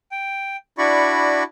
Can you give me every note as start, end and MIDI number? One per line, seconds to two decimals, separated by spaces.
0.12 0.57 79
0.78 1.43 62
0.78 1.43 64
0.78 1.43 66
0.78 1.43 74
0.78 1.43 83
0.78 1.43 85